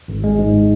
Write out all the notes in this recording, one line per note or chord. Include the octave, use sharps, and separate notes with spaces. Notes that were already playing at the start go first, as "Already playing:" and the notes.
G#1
G#3
G#2